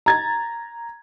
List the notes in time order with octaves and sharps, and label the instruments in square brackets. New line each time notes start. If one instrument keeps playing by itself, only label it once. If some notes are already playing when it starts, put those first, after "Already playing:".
[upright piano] A#5 G#6 A6